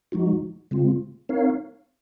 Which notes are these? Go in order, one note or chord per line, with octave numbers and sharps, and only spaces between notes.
F3 G#3 D#4 F#4
C#3 G#3 C4 F4
C4 D#4 A#4 C#5 F5